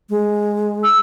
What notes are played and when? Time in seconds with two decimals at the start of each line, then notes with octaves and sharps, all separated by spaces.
0.10 G#3
0.83 E6